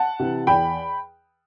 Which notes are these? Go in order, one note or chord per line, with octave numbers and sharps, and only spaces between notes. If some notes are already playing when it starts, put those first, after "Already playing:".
Already playing: F#5 A5
C3 E3
E2 G5 B5